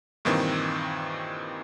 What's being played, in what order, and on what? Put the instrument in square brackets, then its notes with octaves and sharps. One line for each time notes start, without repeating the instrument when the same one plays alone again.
[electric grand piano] G2 A#2 D#3 E3 C4